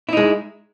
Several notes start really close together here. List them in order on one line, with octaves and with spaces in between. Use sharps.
E4 D#4 G#3